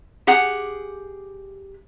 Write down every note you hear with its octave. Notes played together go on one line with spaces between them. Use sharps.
G4 G#4 F#5